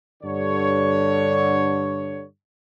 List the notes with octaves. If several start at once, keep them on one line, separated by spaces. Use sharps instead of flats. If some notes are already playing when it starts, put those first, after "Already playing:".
G2 D3 C#5